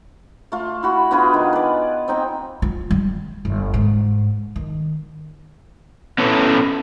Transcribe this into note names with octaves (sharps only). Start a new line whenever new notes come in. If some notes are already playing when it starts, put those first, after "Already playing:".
A3 F4
E4 F#4 B5
B3 D4 F4 G#4
D#3
B4 D5
C4 D#4 G5
F4
G3
G1
G#2
D#3
B3 C#4 E4 A4 B4